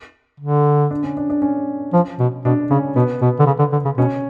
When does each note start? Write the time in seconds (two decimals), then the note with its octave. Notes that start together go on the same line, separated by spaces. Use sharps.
0.40 D3
0.91 D4
1.03 C#4
1.17 D4
1.30 D4
1.42 C#4
1.93 F3
2.19 B2
2.45 B2 D4
2.70 C#3 C#4
2.96 B2 B3
3.21 B2 B3
3.39 D3
3.46 C#3
3.59 D3
3.72 D3
3.85 C#3
3.97 B2 C#4